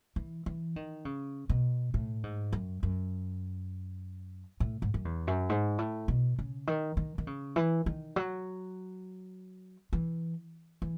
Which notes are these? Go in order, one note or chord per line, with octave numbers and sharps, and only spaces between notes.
E3
E3
D#3
C#3
B2
A2
G#2
F#2
F#2
A2
G#2
F#2
E2
F#2
G#2
A2
B2
C#3
D#3
D#3
D#3
C#3
E3
D#3
F#3
E3
E3